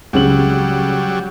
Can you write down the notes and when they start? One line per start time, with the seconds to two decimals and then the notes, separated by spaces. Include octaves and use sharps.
0.13 C#2 C#3 F#3 G3 F#7